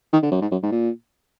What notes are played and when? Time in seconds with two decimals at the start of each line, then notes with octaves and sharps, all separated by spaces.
0.13 D#3
0.23 D3
0.32 F#2
0.41 G#2
0.51 F#2
0.63 G#2
0.72 A#2